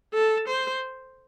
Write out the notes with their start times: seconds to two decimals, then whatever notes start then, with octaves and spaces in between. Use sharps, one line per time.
0.14 A4
0.48 C5